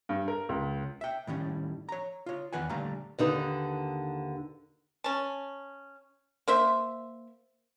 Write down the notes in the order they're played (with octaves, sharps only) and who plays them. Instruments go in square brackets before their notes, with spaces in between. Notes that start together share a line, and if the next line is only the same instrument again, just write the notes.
[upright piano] G2
A#4
C#2
[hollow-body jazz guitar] E5 G5
A2 D#3 G3 C#4
C#5 A#5
F4 C#5
E2 D#3 B4 F#5 G#5
A#2 D3 G3 A3 F5 A#5
[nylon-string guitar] D#2 D3 D#4 B4
[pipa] C#4 A5
A#3 C5 E5